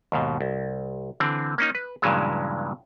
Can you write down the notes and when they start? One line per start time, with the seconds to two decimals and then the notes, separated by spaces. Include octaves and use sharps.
0.12 D#2 G#2 B2
0.41 C2
1.20 D3 E3 C4
1.58 A#3 C#4 D#4
1.75 B4
2.02 G2 A#2 C#3 E3 F#3 G#3